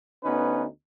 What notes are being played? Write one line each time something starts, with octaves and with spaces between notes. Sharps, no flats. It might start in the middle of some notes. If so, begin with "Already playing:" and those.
D2 B3 C#4 D#4 B4